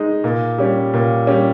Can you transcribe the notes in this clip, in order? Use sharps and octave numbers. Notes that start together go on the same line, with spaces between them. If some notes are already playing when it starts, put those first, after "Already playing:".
Already playing: G#3 D#4
A#2
G3 C#4
A#2
G3 C#4